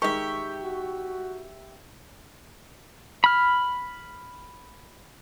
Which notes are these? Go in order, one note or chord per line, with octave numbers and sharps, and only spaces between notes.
D#3 G#3 G4 A#4 E5 C#6
F#4
B5 F6